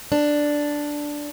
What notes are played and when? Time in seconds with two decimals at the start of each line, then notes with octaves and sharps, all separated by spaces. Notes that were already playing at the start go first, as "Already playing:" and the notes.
0.12 D4